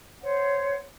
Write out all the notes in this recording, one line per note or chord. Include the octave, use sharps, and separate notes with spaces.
C5 C#5 F#5